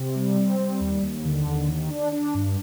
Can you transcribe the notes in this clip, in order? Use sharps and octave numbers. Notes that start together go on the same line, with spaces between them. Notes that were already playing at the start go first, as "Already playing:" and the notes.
Already playing: C3
G3
C4
G3
D#2
D#2
D3
D#2
D#3
D4
D4
G2